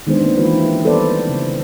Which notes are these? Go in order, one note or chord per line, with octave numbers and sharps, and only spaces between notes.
D#3 G#3 B3 D4 C5
D#3 A#3 C4
E3 A3 A#3 F4 A#4 B4
E4 G4
G3 B3 A4 B4 C5 D5
C#3 C4